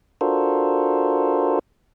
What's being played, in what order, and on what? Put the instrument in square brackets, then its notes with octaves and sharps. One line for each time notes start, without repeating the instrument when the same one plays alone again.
[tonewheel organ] D4 F4 F#4 A4 A#4 C5